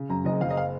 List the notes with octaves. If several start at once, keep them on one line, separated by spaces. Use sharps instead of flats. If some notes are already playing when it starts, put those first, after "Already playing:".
Already playing: C#3
F#2 A#5
F#1 D#5
F#1 F5
D#5
F5